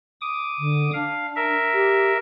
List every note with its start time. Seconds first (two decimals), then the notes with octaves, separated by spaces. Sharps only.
0.21 D6 D#6
0.59 D3
0.93 D4 F5
1.36 A#4 E5
1.74 G4